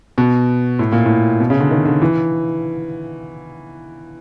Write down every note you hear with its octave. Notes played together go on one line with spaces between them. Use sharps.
B2
A2
A#2
A2
B2
C#3
D3
D#3
D3
E3